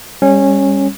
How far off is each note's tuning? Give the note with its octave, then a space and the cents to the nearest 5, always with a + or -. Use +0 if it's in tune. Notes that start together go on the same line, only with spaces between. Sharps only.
G3 +30 C#4 -15